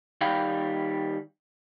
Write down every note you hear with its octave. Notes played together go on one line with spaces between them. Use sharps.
D#3 G3 F5 G5 B5